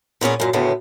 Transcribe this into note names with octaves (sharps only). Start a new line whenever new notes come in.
A#2 B3 C#4 G#4
F#2 A#2
D2 A2 C#3 B3 G4